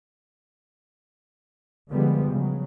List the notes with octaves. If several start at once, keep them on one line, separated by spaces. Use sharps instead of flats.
D3 F3 G3 G#3 B3
C#3 F#3